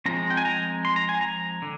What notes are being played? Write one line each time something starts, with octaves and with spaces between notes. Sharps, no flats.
F3 G#3 C4 A#5
G5
G#5
A#5
C6
A#5
G#5
A#5
D3